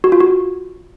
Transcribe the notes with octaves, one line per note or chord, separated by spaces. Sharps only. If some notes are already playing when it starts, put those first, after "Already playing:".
F#4
F4
F#4